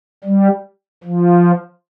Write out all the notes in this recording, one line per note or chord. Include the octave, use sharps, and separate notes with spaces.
G3
F3